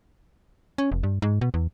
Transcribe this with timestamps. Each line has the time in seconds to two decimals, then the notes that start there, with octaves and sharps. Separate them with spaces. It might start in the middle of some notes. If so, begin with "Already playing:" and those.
0.78 C#4
0.92 F1
1.03 G2
1.22 G#2
1.41 B2
1.54 E2